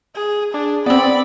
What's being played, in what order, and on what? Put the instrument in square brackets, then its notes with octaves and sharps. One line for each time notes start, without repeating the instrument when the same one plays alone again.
[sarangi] G#4
[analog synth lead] D4 [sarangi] G#4
[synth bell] B3 C4 [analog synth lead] D5 [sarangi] B5